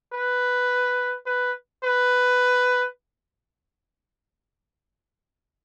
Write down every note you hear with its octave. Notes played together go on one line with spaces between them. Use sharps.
B4
B4
B4